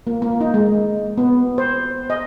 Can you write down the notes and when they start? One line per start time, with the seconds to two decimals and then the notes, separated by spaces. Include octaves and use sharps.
0.07 A#3
0.22 A#3
0.41 D#4
0.54 G#3
1.18 B3
1.58 C5
2.10 D#5